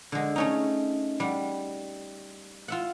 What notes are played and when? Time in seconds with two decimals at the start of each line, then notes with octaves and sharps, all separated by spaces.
0.12 D3 G#3
0.36 A3 C#4 D#4
1.20 G3 F#5
2.68 F4 E5 F#5